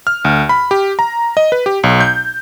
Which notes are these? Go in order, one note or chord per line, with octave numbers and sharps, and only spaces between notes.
F6
D2
B5
G4
A#5
D#5
B4
G4
B1
G6